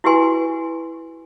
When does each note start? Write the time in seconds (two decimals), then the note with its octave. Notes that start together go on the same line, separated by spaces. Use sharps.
0.04 E4 F#4 G4 B4 G#5 C6